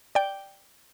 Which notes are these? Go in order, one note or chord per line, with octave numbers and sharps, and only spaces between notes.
D5 G5